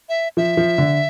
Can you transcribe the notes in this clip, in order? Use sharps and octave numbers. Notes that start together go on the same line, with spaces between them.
E5
F3 E5
F3
D3